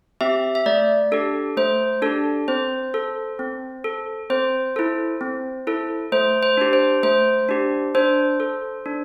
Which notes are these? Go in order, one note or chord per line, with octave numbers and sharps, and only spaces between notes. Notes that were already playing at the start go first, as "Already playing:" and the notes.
C4 G4 E5
E5
A3 D5
D4 G4 A4
A3 C5
D4 G4 A4
C4 C5
A4
C4
A4
C4 C5
E4 A4
C4
E4 A4
A3 C5
C5
D4 G4
C5
A3 C5
D4 G4
D4 C5
A4
D4